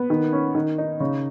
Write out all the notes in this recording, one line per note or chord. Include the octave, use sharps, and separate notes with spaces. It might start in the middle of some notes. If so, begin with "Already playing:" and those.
Already playing: B3
D#3
C#4
D#3
D#4
C#3